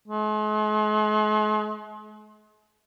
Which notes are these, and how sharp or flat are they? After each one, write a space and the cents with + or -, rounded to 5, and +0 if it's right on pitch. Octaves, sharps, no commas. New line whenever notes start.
G#3 +45